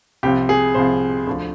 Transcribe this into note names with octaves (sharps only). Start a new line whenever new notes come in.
C2 C3 F3 G4
G#4
C2 C3 F3 C5
D2 D3 F3